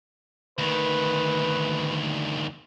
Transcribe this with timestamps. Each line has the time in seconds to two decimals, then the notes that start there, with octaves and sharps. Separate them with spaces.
0.58 D2 D#3 B4